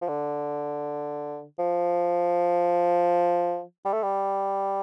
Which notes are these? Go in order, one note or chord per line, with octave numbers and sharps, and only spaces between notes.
F3
D3
F3
G3
A3
G3